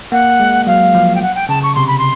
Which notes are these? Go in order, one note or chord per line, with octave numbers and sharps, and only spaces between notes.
A#3 F#5
G#3
F#3 F5
F3
G5
F#5
G5
C#3 A5
C#6
C3 C6
B5
C6